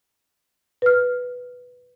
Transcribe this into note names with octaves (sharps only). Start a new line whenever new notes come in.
B4 F6